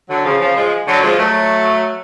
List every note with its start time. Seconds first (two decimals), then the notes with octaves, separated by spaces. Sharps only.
0.09 D3 F#3
0.25 C#3 F3
0.40 C#3 F3
0.56 F3 G#3
0.87 D3 F#3
1.03 F3 G#3
1.18 F#3 A3